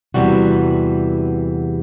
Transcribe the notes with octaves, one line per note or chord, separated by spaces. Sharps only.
E2 G#2 C3 E3 G3 F#4